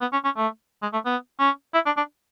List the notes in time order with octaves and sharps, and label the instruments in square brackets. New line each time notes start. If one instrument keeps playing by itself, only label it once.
[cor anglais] B3
C#4
C#4
A3
G#3
A3
B3
C#4
E4
D4
D4